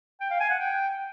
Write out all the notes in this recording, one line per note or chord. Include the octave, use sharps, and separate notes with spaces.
G5
F5
G#5
F#5
G5